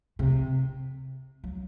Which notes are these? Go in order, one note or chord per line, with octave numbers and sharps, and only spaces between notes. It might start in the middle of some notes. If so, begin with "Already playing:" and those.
C3
F#3